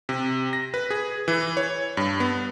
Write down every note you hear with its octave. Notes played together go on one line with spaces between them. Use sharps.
C3
A#6
B4
G#4
E3
C#5
G2
B3